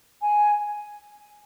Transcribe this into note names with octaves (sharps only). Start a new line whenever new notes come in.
G#5